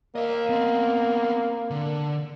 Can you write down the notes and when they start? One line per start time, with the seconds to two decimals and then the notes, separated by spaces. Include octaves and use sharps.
0.16 A#3 D#5 F5
0.50 B3 C4
1.70 D3